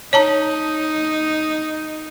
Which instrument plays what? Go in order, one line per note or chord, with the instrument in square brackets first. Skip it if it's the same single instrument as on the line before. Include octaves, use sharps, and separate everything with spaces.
[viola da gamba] D#4 [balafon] C#5 A5 A#5